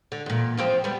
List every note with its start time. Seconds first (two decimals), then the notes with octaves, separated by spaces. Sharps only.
0.12 D3
0.26 E2 A#2
0.57 E2 F3 C4
0.84 G3 B3